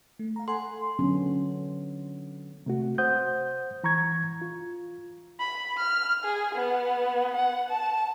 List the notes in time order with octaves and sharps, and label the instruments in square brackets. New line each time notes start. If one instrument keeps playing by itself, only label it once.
[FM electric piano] A3
F5 A#5
[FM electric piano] A4 F#5 G#5 [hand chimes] C6
[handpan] D3 F#3 B3 C#4 A4
[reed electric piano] C3 A3 F#4
C5 F#5 D#6 G6
E3 A#5 C#6 G#6
F4
[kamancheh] B5
F6
G#4
B3
F#5
A5